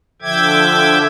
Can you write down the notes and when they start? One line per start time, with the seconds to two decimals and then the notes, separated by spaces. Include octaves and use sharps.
0.22 D3 F3 E5 G5 D6 G#6